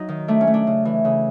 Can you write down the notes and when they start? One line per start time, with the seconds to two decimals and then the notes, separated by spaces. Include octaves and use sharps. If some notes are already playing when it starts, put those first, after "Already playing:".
Already playing: F#3 D#4
0.09 D#3
0.28 A3 D4
0.41 C#4
0.47 A3
0.54 D4
0.67 C#3
0.85 E3
1.05 C#3